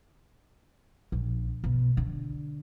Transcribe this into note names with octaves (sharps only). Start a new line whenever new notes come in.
A#1
B2
D3